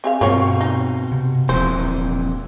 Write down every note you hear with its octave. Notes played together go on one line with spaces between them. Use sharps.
C4 G#4 F5
G2 B2 A#3 C4 F4 C#5 F5
D#4
C3
D#1 F2 A#2 E3 C5